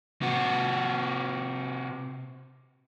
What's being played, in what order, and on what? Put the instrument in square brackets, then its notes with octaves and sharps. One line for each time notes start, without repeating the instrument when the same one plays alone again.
[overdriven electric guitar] C3 F#4